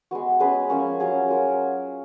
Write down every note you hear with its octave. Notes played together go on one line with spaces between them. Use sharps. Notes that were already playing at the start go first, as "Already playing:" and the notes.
G#3 B3 F#4
G#3 C#4 G#4 B4
F3 A#3 C#4
F#3 C#4 G#4
F#3 A#3 F4 A#4